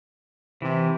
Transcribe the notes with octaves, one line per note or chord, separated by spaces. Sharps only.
C3 E3